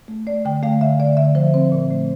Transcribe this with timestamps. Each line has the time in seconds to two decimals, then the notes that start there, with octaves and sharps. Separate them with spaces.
0.08 A3
0.27 A3 D5
0.45 D3 G5
0.63 A3 F5
0.81 D3 E5
0.99 D3 D5
1.17 D3 E5
1.35 F3 C5
1.54 C4 C5
1.72 A#2
1.91 A3